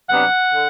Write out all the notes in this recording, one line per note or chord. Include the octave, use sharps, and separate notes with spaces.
C3 F#3 B3 D4 F#5
D3